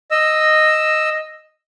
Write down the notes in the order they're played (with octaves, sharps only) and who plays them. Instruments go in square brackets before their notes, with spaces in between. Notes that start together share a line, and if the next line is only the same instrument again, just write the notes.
[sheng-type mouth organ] D#5 E6